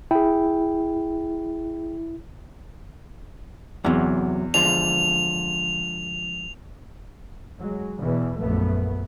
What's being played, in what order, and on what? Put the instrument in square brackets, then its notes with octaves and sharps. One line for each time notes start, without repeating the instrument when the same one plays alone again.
[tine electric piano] E4 [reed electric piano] G#4 G5
[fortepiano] E2 [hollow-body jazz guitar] C3 F#3
[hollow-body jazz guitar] D3 F3 G#3 [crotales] F7
[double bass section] F#3 G#3
E2 B2 E3
A#1 F#2 A3 B3